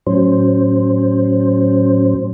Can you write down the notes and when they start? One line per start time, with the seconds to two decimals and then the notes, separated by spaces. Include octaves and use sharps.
0.07 A2 F#3 C#4 C5